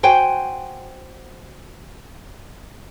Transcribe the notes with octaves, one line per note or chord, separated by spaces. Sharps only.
F#4 C5 G5 G#5